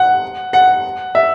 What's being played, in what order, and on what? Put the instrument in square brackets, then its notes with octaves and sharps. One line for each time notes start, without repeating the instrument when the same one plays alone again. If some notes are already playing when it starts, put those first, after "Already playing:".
Already playing: [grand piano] F#5
F#5
E5